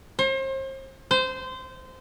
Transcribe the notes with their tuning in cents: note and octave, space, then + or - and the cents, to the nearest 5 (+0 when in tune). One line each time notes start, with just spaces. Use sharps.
C5 +40
C5 -20